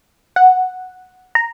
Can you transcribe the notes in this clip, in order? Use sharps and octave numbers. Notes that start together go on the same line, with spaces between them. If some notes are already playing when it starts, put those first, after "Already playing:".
F#5
A#5